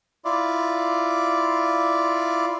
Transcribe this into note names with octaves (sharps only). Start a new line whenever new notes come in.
E4 F4 D5